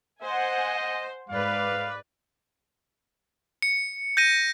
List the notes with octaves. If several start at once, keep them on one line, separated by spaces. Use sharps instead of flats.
C5 D#5 F#5 G#5
G#2 B4 D5 F5
C#7
G6 A#6 D#7